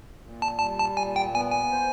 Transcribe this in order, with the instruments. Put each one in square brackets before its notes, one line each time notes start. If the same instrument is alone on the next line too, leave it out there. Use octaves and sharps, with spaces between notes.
[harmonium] A#2
[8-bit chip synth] A5
[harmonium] G3 [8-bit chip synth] A5
[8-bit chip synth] A5
[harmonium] A#2 [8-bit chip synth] G#5
[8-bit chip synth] G5
[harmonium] B3 [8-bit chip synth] G#5
[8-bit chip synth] G#5
[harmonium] C5